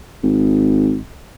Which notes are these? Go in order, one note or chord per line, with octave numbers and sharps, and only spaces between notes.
G#1